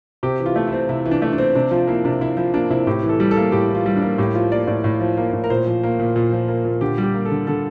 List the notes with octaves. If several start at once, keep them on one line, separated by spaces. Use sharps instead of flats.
C3 G4
E3
F4
A3
E4
C4
C3 E4
E3
D4
A3
D4
C4
C3 D4
F3 F4
A#3 E4
C3 D4
C3 E4
F3 E4
A#3 D4
C3 E4
A2 G4
E3
A4
G3
A4
A#3
A2 G4
E3
F4
G3
D4
A#3
A2 G4
F3 F4
A#3 D5
A2 D5
A2
F3
A#3
A2
A#4
A#2 C5
F3
A#3
A#2
A#2
F3
A#3
A#2
D3 G4
G3
G4
A#3
A4
D3
D3 A4